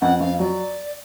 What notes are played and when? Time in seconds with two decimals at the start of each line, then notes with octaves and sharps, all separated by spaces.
0.01 F2 F#5
0.20 F2 F5
0.39 F#3 D5